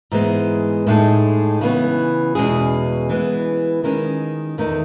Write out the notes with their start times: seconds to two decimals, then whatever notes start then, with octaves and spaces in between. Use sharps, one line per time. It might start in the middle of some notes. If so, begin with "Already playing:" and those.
0.12 G#2 E3 G#3 B3
0.87 A2 G#3 D#4 A4
1.61 C#3 E3 B3
2.35 E2 B2 G#3 C#4 G#4
3.09 E3 G#3 B3
3.84 D#3 G#3 C#4
4.58 E2 D#3 A3 D#4